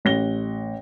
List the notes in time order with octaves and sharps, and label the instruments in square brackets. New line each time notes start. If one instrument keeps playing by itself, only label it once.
[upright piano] A1 A#6 G7